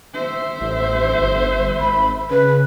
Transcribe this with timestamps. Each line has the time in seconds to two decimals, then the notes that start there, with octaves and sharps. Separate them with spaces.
0.14 C5 E5
0.61 A1
1.14 G1
1.80 G#1 B5
2.30 C#3 B4